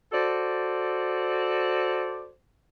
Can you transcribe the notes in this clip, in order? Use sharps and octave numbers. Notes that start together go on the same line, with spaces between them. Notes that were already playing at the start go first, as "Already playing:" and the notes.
F#4 A4 C5 D5